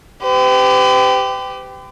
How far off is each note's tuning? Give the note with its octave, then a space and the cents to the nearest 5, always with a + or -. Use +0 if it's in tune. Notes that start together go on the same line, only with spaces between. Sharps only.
G4 +0 B4 +45